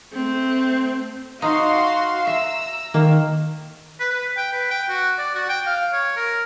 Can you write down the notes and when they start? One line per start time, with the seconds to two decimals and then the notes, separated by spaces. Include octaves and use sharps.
0.13 A3 C4
1.42 D#4 F#4 F5 C6
2.27 E5 A#5 E6
2.94 D#3 A#3
4.00 B4
4.12 B4
4.37 G5
4.53 B4
4.71 G5
4.89 F#4
5.19 D5
5.35 F#4
5.49 G5
5.66 F5
5.93 C#5
6.16 A#4